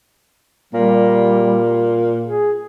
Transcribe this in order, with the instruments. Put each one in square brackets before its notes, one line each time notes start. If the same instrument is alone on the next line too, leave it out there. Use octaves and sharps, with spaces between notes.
[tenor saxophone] A#2 [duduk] G3
[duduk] G#4